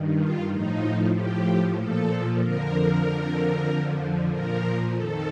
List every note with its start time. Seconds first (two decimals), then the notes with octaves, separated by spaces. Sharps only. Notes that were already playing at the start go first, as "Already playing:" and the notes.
Already playing: G2 D#3
0.19 F4
0.50 A2 F3 D#4
1.14 A2 F3 G4
1.77 A#2 F3 A4
2.41 F2 D3 F3 A#4
3.04 F2 D3 F3
3.67 F2 D3 F3
4.31 A#2 F3 A#4
4.94 F2 D#3 A4